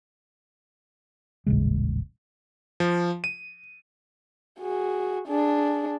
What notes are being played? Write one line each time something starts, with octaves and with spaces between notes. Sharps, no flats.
D#1 A1 C#3 G#3
F3
D#7
F#4 G#4
D4 G#4